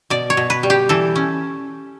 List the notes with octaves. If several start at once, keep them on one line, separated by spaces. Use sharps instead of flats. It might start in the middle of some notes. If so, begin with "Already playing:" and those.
B2 D5
C#5
B2
B4
G3
G4
E3 A4
C#4